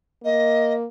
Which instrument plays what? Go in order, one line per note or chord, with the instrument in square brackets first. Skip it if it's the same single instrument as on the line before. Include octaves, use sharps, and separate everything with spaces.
[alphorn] A#3 [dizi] D#5